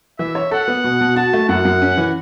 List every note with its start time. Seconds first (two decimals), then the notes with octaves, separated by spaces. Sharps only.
0.19 E3 E5
0.35 C#5
0.51 A4 F#5
0.68 B3
0.84 B2
1.01 B2
1.16 F#4 A5
1.33 A3
1.49 F#2 F#5
1.65 F#2
1.82 C#4
1.97 E3